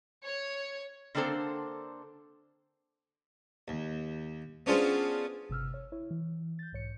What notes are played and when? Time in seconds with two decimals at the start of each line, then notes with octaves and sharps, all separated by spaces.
0.24 C#5
1.15 D3 A#3 C4 D4 A4 C5
3.68 D#2
4.66 B3 C#4 D4 F4 G#4 C5
5.49 G1 C3 E6 F6
5.74 C#5
5.92 E4 C#5
6.11 E3
6.59 G6 A6
6.72 B1 G#2 C#5 C#7